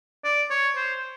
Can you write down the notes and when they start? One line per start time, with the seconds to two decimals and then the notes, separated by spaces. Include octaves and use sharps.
0.25 D5
0.50 C#5
0.76 C5